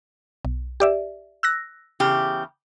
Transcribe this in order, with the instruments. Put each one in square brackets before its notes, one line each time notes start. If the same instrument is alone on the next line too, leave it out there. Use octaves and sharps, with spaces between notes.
[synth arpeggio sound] B1
G4 D5 E5
E6 F#6 A#6
[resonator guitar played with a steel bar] E2 C#3 G4